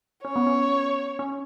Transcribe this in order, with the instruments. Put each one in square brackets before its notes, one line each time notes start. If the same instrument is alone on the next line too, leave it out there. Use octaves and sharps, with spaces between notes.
[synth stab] C#4 [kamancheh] C#5
[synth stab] B3
C#4
C#4